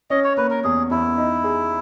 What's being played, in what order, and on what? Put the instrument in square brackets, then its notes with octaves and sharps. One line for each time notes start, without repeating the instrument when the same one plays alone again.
[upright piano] C#4 [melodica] D#5
[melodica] C#5
[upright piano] A#3 [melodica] B4
[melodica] A#4
[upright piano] E2 [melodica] G#4
[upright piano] E2 [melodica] E4
[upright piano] D#4
G#4